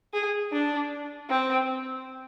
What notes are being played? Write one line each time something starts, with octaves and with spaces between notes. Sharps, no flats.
G#4
D4
C4